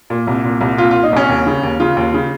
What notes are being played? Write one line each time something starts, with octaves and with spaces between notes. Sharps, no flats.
A#2
C2
A#2
C2
A#2 F4
A#2 F4
D#4
C2 C#4
D#2
C#3
D#2
C#3 F4
D#2
C#3